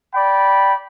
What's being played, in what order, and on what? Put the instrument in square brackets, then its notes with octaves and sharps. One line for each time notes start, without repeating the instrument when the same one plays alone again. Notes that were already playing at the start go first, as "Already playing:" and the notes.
[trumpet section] D5 G5 B5